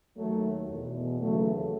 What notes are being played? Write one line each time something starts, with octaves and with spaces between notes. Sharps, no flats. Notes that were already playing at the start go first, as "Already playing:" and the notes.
D#2 D#3 F#3 A3
E2 B2
D#2 C#3 E3 F#3 A3